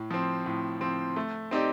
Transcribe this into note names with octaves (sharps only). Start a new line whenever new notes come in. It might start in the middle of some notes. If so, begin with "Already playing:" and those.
Already playing: A2
F3 C4
A2
F3 C4
A3
C4 D#4 G4 D5